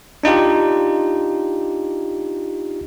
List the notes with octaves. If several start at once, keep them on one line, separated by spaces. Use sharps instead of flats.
D4 D#4 F4 G4